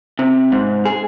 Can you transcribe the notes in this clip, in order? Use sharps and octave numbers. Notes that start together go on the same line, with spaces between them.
C3
G#2
G#4